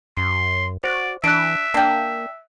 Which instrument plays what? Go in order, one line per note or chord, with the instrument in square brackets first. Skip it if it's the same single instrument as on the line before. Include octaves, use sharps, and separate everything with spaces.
[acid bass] F#2 [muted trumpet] C6
[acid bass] F#4 [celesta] C5 [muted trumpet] D5
[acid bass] E3 [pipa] D4 [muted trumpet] E5 [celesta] F#6 D7
[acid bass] A#3 [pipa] D4 G5